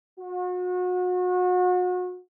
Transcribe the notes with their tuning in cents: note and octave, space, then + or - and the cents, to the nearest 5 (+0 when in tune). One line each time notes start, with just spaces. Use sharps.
F#4 -35